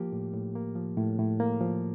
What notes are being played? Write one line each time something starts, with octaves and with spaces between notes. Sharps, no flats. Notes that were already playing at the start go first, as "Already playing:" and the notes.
Already playing: F3 A#3 G4
A2
A2
A#3
F3
A2
A2
A#3
F3